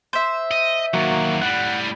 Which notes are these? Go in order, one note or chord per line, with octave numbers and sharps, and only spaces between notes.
C5 E5
D#5
D#3 F#3 A#3 F#4
A2 G3 F#5